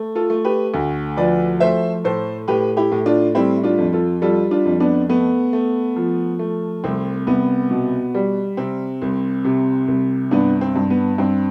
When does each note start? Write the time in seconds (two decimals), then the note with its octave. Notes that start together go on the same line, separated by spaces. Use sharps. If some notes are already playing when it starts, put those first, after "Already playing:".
Already playing: A3
0.15 F4 A4
0.30 A3
0.45 G4 B4
0.74 D2
1.17 F3 B4 D5
1.60 A3 C5 E5
2.04 A2 A4 C5
2.48 A2 G4 B4
2.77 E4 G4
2.92 A2
3.06 D4 F4
3.35 G3 C4 E4
3.64 D4 F4
3.78 F2
3.93 F4 A4
4.22 G3 F4 A4
4.51 D4 F4
4.65 F2
4.80 B3 D4
5.09 A3 B3
5.53 A3
5.96 F3
6.39 A3
6.84 C2 C4
7.27 C2 B3
7.71 B2
8.14 G3
8.57 C3 C4
9.02 C2
9.45 C3
9.88 C2
10.31 G2 B3 D4
10.61 C4
10.76 G2
10.90 B3
11.18 G2 C4